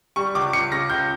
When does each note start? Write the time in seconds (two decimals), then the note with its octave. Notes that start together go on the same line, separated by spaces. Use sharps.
0.16 G3 C#6
0.35 C#2 D6
0.53 C#2 C#7
0.71 C#3 A#6
0.90 C#2 G6